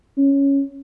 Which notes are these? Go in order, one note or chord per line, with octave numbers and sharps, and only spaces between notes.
C#4